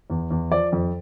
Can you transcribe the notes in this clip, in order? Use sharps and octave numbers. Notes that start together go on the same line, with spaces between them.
E2
E2
F3 D5
F2